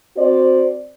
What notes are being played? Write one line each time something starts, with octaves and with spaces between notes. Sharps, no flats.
C4 F#4 C5 D5